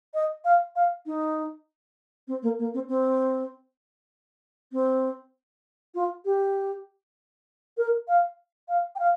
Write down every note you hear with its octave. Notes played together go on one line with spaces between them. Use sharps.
D#5
F5
F5
D#4
C4
A#3
A#3
C4
C4
C4
F4
G4
A#4
F5
F5
G5
F5